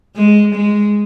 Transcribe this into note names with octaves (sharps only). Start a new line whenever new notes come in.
G#3
G#3